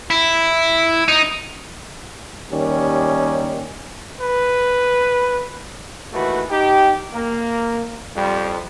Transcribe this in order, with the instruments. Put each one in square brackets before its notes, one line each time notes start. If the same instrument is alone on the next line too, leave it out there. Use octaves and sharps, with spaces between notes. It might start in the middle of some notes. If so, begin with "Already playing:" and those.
[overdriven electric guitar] E4
D#4
[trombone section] D#2 D#3 G3 C#4
[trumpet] B4
[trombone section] D#2 E3 A3 F#4 B4
D#4 G4
A#3
F2 G3